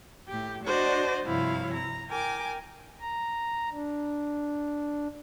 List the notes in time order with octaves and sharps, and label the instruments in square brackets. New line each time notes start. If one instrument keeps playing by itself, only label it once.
[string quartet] A2 G4
D4 F#4 C5 D5 D#5
G2 C3 F3 E4 C#5 F5
A#5
A#4 G5 G#5 D6
[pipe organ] A#5
D4